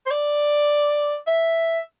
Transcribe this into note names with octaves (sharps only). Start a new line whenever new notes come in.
C5
D5
E5